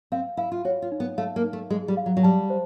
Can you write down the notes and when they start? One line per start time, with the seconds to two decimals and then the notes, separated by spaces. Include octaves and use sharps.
0.12 C4 F5
0.37 E4 F5
0.52 F4
0.65 F#4 C#5
0.82 F4
0.92 D#4
1.00 B3
1.18 A3 F5
1.36 A#3
1.44 D#4
1.53 A3
1.70 G#3 G#4
1.88 G3
1.97 F5
2.06 F#3
2.17 F#3
2.23 G3 A5
2.50 C5